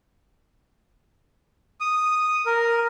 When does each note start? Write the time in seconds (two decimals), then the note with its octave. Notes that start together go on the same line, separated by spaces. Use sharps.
1.80 D#6
2.46 A#4